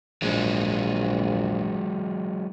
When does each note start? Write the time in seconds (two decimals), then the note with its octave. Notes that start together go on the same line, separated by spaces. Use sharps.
0.22 A#1 F#3 G#3 D#4